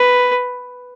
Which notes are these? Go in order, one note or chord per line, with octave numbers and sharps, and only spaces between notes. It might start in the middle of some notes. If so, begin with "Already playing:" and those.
Already playing: B4